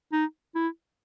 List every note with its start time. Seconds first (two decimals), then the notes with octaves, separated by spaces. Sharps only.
0.12 D#4
0.55 E4